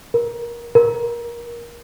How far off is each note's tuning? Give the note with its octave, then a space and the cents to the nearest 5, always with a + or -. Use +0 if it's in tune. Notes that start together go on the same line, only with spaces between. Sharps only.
A#4 +20
A#4 +20